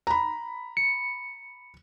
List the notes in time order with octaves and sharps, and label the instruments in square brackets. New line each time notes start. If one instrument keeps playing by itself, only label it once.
[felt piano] A#5 B5
[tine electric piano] C#7